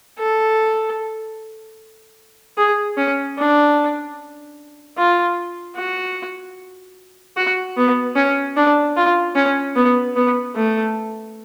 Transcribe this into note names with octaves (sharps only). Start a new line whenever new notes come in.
A4
G#4
C#4
D4
F4
F#4
F#4
B3
C#4
D4
F4
C#4
B3
B3
A3